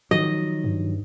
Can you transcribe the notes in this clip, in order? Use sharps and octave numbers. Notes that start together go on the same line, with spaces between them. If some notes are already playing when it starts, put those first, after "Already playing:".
D#3 F3 F#3 D#5
G2